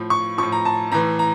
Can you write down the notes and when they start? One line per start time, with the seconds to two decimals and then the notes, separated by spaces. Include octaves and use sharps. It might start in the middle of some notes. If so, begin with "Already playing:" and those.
Already playing: A2 F3
0.10 C#6
0.38 F3 C#6
0.43 A2
0.52 A#5
0.65 A5
0.92 A2 E3 A#5
1.19 A#5